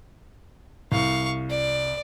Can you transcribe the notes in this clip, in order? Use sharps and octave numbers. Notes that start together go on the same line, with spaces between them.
C2 F5 C#6
D5